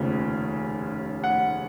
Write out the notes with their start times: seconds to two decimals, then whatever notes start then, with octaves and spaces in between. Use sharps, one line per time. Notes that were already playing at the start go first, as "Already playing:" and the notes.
Already playing: F1 D#2 C#3 F3
1.24 F#5